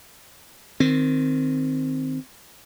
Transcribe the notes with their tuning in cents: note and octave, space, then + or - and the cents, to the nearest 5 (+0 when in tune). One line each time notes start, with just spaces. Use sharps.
D#3 +0 C4 +0